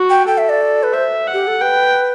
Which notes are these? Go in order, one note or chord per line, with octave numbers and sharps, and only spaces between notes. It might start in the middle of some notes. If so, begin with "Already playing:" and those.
Already playing: F#4
G5
A4 G5
E5
D5
B4
C5 E5
F#5
G4
A4
B4 G5